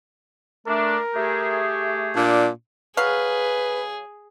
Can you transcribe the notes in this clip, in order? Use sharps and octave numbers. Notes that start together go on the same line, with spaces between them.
A3 D4 A#4
A3 G4 G#4
A#2 D4
F#3 G#4 B4 F5